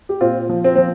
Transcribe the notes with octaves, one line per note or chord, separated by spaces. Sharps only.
G4
A#2 C4 F4
F3
C4
F3 C4